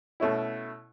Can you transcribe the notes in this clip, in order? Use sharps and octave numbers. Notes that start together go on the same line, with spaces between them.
B2 A3 C#4 E4